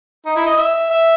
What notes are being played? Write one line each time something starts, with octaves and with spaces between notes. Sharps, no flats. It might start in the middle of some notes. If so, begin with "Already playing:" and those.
D#4
E4
D#5
E5
E5